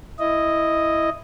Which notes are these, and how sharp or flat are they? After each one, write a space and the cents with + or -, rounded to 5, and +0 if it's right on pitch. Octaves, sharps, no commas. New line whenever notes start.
E4 +0 D#5 +0